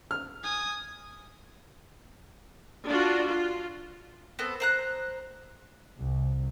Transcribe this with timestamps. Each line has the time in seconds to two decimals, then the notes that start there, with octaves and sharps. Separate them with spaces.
0.11 F6
0.43 G#5 D#6
2.87 D4 F4 F#4
3.28 F4
4.39 B3 C4 A4
4.60 C5 A#5 F#6
5.99 C2